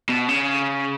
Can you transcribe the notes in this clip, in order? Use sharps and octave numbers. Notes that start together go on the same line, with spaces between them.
B2
C#3